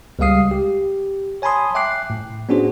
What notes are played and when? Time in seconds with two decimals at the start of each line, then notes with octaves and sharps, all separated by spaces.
0.19 C#2 G3 G#3 F5 D#6 C7
0.51 G4
1.42 C#5 G#5 A5 B5 C6 D#6
1.75 E5 G5 D6 F#6 C7
2.10 A2
2.49 B3 C#4 D4 F#4 G#4 C5